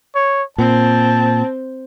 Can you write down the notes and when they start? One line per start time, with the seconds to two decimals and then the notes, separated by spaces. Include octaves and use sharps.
0.15 C#5
0.58 A#2 C4 A5